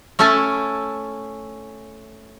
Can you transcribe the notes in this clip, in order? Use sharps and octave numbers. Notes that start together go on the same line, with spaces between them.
A3 C#4 E4 A4 G#5 A5